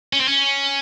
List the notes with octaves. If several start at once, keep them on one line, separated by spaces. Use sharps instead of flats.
C#4
C4
C#4